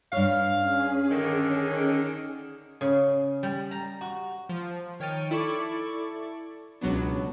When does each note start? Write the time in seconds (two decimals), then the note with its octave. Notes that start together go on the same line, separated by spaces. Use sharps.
0.13 G2 C#5 F5
0.59 C#4 G#4
1.11 D3 D#3
2.81 C#3
3.43 G3
3.71 A#5
4.01 F#4
4.49 F3
5.00 D#3 C#5 G5 F6 A6 D#7
5.31 E4 A4 D5 C#6 D6
6.81 C#2 B2 F#3 B3 D4